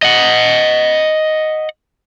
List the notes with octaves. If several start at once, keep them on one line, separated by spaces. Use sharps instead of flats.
D#5 F#5